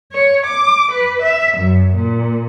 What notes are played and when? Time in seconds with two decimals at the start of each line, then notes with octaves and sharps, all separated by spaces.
0.11 C#5
0.46 D6
0.90 B4
1.22 E5
1.57 F#2
1.96 A#2